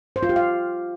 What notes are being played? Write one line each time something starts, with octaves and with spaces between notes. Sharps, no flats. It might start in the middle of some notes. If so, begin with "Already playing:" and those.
C5
F4
G4
F5